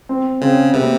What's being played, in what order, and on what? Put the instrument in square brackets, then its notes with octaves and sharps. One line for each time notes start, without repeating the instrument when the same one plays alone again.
[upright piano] C4
[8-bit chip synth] C#3 [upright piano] C4
[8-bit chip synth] C3 [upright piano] B3
[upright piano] A#3